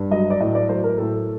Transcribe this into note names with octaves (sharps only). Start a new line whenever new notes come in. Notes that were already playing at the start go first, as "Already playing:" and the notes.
Already playing: G2
F#3 D#5
D5
A2 D#5
D5
F#3 C5
A#4
A2 A4